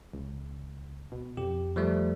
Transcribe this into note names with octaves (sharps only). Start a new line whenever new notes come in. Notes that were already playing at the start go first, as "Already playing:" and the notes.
C#2
B2
F2 G4
F3 G3 A3